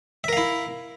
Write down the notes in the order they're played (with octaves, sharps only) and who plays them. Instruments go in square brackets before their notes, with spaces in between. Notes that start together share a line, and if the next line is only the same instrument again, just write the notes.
[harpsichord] E5
A#4
F5
E4